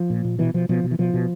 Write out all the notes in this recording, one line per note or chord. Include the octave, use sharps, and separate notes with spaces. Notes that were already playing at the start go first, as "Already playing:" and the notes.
Already playing: F3
A#2
A#2
B2 E3
B2 F3
B2 F3
B2
E3
B2 F3
B2